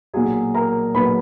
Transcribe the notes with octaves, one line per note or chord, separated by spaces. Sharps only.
B1 A#2 F#3 G#4 G#5
A#4 A#5
B1 A#2 F#3 B4 B5